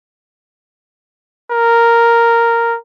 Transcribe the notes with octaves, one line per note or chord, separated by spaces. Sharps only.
A#4